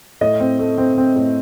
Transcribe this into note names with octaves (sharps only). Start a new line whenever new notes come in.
A2 D#5
C4
A3
C4
C4
A2